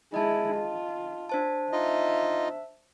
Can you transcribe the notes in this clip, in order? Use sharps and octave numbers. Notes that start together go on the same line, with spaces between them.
G#3 E4 D#5 A5
F4
D4 C5 A5
D#4 F4 D#5 E5